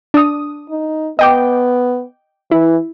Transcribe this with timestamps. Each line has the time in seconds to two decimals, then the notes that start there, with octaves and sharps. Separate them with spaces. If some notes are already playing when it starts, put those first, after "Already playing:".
0.14 D4 D#6
0.70 D#4
1.19 B3 D#5 G5 D6
2.51 E3 E4